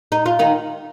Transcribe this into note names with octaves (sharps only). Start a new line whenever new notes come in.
D#4
F4
D#3 D#4